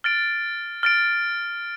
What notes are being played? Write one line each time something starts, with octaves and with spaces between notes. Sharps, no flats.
F6 A6 D7
F6 A6 D7